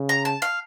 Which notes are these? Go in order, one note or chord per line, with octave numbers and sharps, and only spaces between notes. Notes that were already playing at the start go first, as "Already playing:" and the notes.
Already playing: C#3
A#5
A5
F5